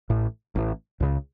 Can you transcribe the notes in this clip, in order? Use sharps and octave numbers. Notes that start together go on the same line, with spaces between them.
A1 A2
A1 A2
C#2 C#3